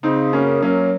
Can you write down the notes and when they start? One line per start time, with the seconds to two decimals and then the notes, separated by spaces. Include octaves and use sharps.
0.03 C#3 C4 D#4
0.33 F#2 A#3 C#4
0.62 F#3 A#3 C#4